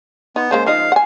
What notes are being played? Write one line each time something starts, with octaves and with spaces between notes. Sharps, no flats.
B3 D#4
G#3 A#3 C#4 C5
F3 D#4 D#5 F5
F#5 G#5